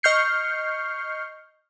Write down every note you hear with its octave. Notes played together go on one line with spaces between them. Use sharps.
D#5 C#6 F6 G6 C7 C#7